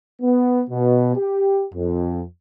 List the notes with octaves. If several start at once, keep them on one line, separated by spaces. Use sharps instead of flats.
B3
B2
G4
F2